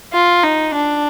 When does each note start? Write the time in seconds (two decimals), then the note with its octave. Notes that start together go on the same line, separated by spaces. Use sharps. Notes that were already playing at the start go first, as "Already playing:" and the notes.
0.13 F4
0.43 D#4
0.75 D4